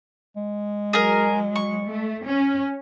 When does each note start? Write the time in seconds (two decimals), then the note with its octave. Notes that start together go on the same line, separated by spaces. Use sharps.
0.36 G#3
0.93 F#3 G#4 A#4
1.56 C#6
1.85 A3
2.24 C#4